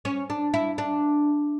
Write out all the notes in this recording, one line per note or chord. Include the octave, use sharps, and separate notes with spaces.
C#4
D4
E4
D4